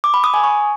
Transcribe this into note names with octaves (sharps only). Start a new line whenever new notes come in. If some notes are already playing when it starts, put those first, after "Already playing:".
D6
B5
D#6
G#5
C#6